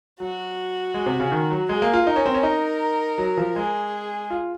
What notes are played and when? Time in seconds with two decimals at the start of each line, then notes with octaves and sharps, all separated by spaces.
0.20 F#3 F#4
0.94 G#3
1.06 C3
1.20 C#3
1.32 D#3
1.51 F#3
1.69 G#3 G#4
1.82 A#3
1.93 F4
2.07 D#4 A#4
2.16 C#4
2.26 C4
2.34 C#4
2.43 D#4
3.18 F#3
3.37 F3
3.55 G#3 G#4
4.30 F4